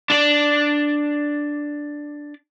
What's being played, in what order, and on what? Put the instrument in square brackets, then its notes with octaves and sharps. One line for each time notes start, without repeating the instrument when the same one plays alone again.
[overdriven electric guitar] D4 D5